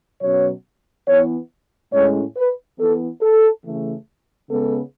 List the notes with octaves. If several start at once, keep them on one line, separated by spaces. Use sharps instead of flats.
B2 F#3 C#4 C#5
E3 B3 C#5
A2 G#3 C#4 C#5
B4
E3 B3 A4
A4
C#3 E3 A3
C#3 G#3 B3 A4